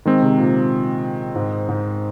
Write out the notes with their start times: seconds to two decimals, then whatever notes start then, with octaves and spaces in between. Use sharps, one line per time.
0.05 D#3 G#3 C4
0.22 C3
0.38 A#2
1.35 G#2
1.68 G#2